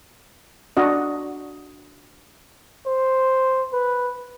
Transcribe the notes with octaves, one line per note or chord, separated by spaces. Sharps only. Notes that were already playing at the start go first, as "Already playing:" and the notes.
D4 F#4 D#5
C5
B4